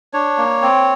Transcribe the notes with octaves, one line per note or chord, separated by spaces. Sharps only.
D4 C#5
A#3
C4